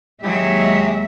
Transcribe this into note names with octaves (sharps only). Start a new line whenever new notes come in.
D#2 F#3 G#3 G4 G#4 D#5 E5